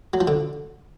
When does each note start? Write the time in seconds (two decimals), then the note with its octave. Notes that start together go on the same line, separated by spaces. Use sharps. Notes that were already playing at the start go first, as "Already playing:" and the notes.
0.14 F#3
0.21 F3
0.27 D3